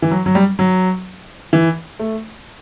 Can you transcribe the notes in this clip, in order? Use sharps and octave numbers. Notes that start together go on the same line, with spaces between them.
E3
F#3
F#3
G3
F#3
E3
A3